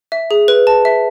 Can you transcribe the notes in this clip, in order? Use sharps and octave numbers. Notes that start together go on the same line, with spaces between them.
E5
G#4
B4
A5
E5